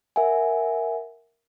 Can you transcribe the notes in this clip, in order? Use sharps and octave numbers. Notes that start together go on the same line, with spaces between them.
A#4 E5 F#5 G#5